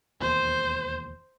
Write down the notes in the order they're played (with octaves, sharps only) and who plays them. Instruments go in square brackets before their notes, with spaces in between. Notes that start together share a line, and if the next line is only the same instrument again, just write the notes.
[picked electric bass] E1 D#2 [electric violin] C5